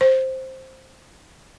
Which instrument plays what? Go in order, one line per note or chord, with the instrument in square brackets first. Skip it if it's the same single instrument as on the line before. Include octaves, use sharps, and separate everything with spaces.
[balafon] C5